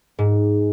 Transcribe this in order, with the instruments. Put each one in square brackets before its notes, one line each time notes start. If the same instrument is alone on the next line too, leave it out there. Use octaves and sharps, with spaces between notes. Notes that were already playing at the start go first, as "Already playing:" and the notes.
[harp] G#2